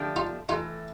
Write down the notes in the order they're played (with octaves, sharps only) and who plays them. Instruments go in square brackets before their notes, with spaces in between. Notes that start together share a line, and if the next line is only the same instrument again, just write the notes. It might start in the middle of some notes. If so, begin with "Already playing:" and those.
Already playing: [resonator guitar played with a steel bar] D3 F3 A3 D4 G4
[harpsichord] D#4 F4
[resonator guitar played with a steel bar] A2 E3 A3 [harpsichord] D#4 F4